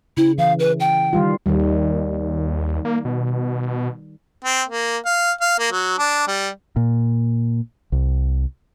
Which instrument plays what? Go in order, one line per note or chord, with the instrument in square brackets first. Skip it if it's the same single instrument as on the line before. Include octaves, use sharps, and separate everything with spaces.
[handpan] C#3 [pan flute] E4
[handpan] E3 [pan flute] F5
[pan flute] B4
G5
[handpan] D#3 G3 F4
[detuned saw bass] D#2 [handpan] D#3 G3
[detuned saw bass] A#3
B2
[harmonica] C4
A#3
F5
F5
A#3
F#3
D4
G3
[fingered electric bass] A#2
C2